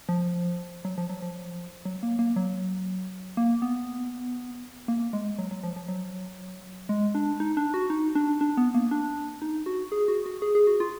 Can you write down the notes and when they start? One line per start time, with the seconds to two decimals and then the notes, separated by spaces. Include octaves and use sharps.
0.09 F3
0.85 F#3
0.98 F3
1.09 F#3
1.22 F3
1.85 F#3
2.03 A#3
2.19 A#3
2.36 F#3
3.37 A#3
3.62 B3
4.88 A#3
5.13 G#3
5.38 F#3
5.51 F#3
5.63 F3
5.76 F3
5.88 F#3
6.89 G#3
7.15 D4
7.40 D#4
7.57 D4
7.74 F#4
7.90 D#4
8.15 D4
8.41 D4
8.57 B3
8.74 A#3
8.91 D4
9.42 D#4
9.66 F#4
9.92 G#4
10.08 F#4
10.26 F#4
10.42 G#4
10.55 G#4
10.67 F#4
10.80 F4